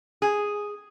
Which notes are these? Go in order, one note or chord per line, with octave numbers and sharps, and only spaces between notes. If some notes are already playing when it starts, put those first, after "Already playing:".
G#4